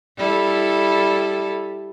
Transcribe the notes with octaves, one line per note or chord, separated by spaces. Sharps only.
G3 E4 A4